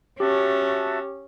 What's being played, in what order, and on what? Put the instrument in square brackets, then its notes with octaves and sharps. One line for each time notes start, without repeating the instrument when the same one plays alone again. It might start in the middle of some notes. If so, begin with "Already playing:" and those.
[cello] C#4 [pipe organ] F#4 E5 A5 [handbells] G4